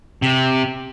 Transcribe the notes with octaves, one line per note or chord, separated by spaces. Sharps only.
C3